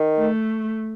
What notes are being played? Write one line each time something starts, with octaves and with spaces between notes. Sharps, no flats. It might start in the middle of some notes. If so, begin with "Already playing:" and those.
Already playing: D#3
A3